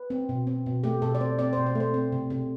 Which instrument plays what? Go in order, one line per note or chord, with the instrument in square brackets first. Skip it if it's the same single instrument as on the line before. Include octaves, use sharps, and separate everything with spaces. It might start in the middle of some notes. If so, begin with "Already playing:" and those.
Already playing: [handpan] B4
C4
B2
C4
B2
A3 G4
B2 A4
D5
C4 C5
C4 D5
B2 C5
C5
A3
C5
C4
C3
C3